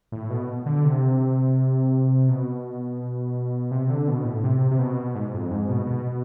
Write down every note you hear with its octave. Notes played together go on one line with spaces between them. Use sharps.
A2
B2
D3
C3
B2
C3
D3
B2
A2
C3
C3
B2
G#2
F2
G#2
B2
B2